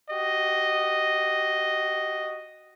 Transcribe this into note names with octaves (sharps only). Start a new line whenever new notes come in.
F#4 G4 D#5